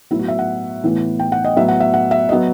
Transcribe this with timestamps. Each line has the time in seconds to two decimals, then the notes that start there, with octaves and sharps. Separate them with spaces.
0.11 A2 F#3 B3 E4
0.19 F#4
0.28 E5
0.39 F#5
0.84 A2 E3 B3
1.19 G5
1.32 F#5
1.45 D#5
1.56 A2 F#3 B3 E5
1.68 F#5
1.80 E5
1.94 F#5
2.11 E5
2.29 D#5
2.32 F#3 B3